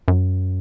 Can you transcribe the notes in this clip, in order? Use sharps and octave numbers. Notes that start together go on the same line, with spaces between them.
F#2